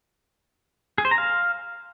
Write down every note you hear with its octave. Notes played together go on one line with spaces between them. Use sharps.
G#4
C5
A#5
F5